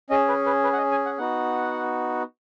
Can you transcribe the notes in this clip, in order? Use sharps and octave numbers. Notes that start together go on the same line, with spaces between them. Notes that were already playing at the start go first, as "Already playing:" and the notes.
C#4 G#4 D#5
B4
B4
B4
F#5
D#5
G#5
F#5
B3 D#4 F#4 F#5